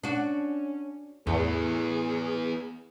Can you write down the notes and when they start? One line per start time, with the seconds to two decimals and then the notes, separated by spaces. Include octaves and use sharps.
0.03 C#4 D4 F#4
1.27 E2 A2 B3 E4 G#4